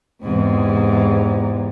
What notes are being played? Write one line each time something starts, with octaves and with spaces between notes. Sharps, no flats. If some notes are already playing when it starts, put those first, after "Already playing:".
E2 G#2 C3